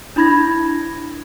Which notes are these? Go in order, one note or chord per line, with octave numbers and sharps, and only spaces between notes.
D4 E4 B5 G#6 A#6